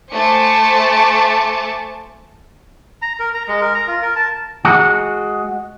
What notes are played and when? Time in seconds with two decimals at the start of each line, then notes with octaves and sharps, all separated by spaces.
0.13 A3 C5 G#5 A5 D6 C#7
3.02 A#5
3.20 A#4
3.34 A#5
3.48 G#3
3.61 A#4
3.74 A#5
3.88 F4
4.02 A#4
4.16 A5
4.65 G#3 F#4